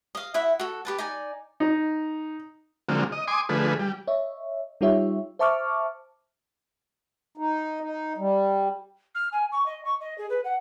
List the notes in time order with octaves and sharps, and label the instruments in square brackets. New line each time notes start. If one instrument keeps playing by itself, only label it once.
[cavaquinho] D#5 F5
E4 E5 F#5
F#4 A4
G4 B4 A5
D#4 D5 G#5
[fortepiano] D#4
[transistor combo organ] D3 F3 F#3 G#3 A#3 C4
D#5
G#5 C6 D6 D#6
D3 F3 A3 G#4 B4
G3
[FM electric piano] C#5 D#5 E5
G3 D#4 F4 G4 C#5 E5
C5 E5 A5 C#6 D6 F6
[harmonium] D#4
D#4
G3
[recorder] F6
G#5
C#6
D#5
C#6
D#5
G#4
B4
F#5